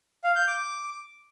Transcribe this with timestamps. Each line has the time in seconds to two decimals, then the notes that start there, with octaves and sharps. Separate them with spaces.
0.24 F5
0.36 G6
0.47 D6